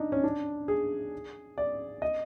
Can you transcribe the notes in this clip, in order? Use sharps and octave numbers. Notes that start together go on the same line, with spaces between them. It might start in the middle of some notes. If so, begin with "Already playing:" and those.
Already playing: D4 D#4
C#4
D4
G#4
D5
D#5